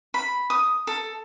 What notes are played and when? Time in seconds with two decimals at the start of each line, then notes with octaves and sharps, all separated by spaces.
0.14 B5
0.50 D#6
0.87 A4